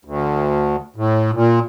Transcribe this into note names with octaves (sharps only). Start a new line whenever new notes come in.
D2
A2
A#2